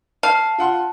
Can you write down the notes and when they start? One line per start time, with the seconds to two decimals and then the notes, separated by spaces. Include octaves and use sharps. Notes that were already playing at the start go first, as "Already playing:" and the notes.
0.23 F5 A5
0.58 F4 F#5 C6